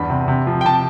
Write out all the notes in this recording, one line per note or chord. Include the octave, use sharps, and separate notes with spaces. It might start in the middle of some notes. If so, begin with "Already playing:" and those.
Already playing: E2 G2 B5
C3
C3
F3
G5
C3 A5